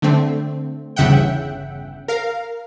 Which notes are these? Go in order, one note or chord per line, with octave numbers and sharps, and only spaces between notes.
D3 A3 C4
G1 E2 C#3 E5 F#5 G5
A#4 F5